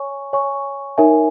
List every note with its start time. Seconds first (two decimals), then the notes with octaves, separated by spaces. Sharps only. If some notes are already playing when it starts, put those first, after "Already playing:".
Already playing: C#5 G#5 C#6
0.33 C#5 G#5 C#6
0.98 D#4 A#4 C#5 E5 G#5